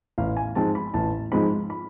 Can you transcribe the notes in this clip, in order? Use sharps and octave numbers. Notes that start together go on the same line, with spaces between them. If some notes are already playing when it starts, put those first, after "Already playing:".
A1 F5
G#5
G#2 F3 G#3 C4 A5
B5
A1 A5
G#2 F3 G#3 C4 B5
B5